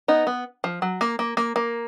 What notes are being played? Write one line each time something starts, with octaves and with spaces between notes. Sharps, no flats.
B3 D#4
B3
F3
F#3
A#3
A#3
A#3
A#3